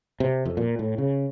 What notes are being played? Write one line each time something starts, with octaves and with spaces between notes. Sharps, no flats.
C3
F2
A#2
A2
C#3